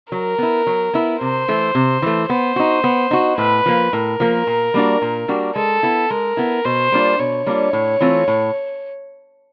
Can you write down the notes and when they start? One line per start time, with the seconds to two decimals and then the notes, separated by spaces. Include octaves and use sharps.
0.12 F#3 A#4
0.38 B3 E4
0.67 F#3
0.94 B3 E4
1.20 C3 C5
1.48 E3 A3
1.75 C3
2.02 E3 A3
2.29 B3 C5
2.56 D#4 F#4
2.84 B3
3.11 D#4 F#4
3.38 A2 B4
3.66 F3 A#3
3.92 A2 A#4
4.20 F3 A#3
4.47 A#2
4.74 G3 A#3 D4 F#4
5.02 A#2
5.28 G3 A#3 D4 F#4
5.56 G#3 A4
5.83 B3 E4
6.10 G#3 A#4
6.37 B3 E4
6.65 B2 C5
6.92 G3 A#3 D4 F4
7.19 B2 C#5
7.46 G3 A#3 D4 F4
7.73 A2
8.01 E3 A3 C4 F4
8.28 A2